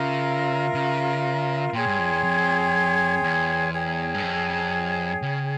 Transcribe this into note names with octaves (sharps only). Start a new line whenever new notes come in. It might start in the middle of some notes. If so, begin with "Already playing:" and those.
Already playing: C#3 F4 A#4 E5 A#5
C#3
A#2 G#4 C#5 G5 C6
G2
F2
E2
F2
E2
G#4 C#5 G5
G2
F2
C#3